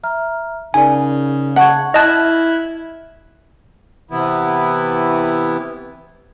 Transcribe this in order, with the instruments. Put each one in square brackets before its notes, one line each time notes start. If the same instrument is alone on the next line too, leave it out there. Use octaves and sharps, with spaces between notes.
[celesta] E5 A#5 F6
[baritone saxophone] C#3 [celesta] D#4 A#4 D5 [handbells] G#5
[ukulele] F#5 [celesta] A5 C#6 G#6
[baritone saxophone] E4 [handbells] D#5 A5 [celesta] F6 F#6 G#6
[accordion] C3 E3 B3 E4